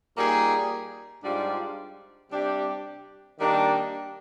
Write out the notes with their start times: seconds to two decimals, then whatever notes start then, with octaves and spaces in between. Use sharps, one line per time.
0.17 A#2 G3 A#3 D#4 G#4
1.23 G#2 G3 D4 F4
2.31 C3 G3 D4 G4
3.38 D#3 G3 A#3 D4 G4